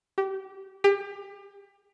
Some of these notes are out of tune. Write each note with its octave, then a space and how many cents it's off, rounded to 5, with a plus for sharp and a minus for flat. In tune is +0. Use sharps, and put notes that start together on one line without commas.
G4 -25
G4 +30